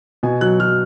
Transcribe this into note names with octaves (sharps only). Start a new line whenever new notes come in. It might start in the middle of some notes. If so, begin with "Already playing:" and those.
B2 G#5
F#3 F#6
F#3 F6